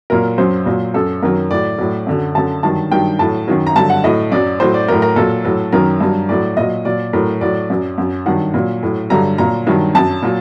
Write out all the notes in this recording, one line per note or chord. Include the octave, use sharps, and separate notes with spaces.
A#2 F#3 A#4
F#2 F#3 C5
A#2 F#3
F#2 F#3 A4
F#2 D#3 F#3 A#4
A2 F#3 D5
A2 F#3
F#2 D3 F#3
F#2 D3 F#3 A5
G2 D#3 F#3 A5
G2 D#3 F#3 G5
A2 F#3 A5
F#2 D#3 F#3
A#5
G2 D3 F#3 A5
F#5
A2 F#3 D#5
F#2 F#3 D5
A2 F#3 C5
D5
A2 F#3 A#4
A#4
A#2 F#3 A4
A2 F#3
F#2 D#3 F#3 A#4
G2 F#3
A2 F#3 D5
A#2 F#3 D#5
A#2 F#3 D5
A2 F#3 A#4
A2 F#3 D5
F#2 F#3
F#2 F#3
G2 D#3 F#3 F#5
A#2 F#3
A2 F#3
G2 D3 F#3 A#5
A#2 F#3 A#5
G2 D#3 F#3
F#2 F#3 A5
A#2 F#3